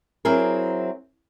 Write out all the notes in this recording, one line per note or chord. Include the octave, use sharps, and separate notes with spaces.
F#3 C4 E4 G#4 A#4